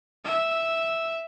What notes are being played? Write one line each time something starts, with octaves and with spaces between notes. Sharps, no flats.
E5